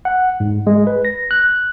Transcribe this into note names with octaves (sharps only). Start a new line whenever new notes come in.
F#5
G#2
G#3
B4
A#6
F#6